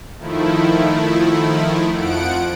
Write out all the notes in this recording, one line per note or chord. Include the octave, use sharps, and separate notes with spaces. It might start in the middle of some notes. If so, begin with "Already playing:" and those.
D#3 F3 A3 E4
F2 F3 F#5 D7